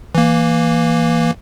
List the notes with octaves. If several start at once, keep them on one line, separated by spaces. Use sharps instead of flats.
E3 A#3